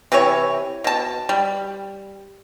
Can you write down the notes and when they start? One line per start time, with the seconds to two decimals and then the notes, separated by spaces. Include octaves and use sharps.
0.12 C3 E3 G4 C#5
0.84 B2 A5
1.29 G3